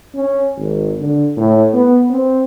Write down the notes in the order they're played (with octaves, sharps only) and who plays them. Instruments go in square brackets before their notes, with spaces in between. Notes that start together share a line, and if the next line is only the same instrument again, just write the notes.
[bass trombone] C#4
G#1
D3
A2
B3
C4